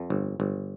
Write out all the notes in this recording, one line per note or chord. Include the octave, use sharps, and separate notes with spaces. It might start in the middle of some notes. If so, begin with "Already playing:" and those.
Already playing: F2
G1
G1